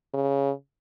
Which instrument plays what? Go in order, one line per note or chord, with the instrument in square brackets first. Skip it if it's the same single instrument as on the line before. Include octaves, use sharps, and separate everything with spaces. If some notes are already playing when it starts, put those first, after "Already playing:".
[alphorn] C#3